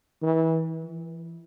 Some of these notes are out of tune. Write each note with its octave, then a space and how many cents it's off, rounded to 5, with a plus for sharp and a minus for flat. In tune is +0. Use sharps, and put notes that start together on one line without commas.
E3 -30
E3 +25